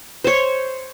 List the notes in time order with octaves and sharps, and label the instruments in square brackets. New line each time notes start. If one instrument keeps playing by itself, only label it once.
[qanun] C5 C#5